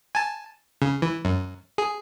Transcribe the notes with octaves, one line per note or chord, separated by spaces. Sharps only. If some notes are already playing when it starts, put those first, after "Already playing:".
G#5 A5
C#3
E3
F#2
G#4